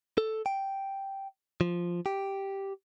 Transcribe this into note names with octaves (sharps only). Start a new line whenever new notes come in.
A4
G5
F3
G4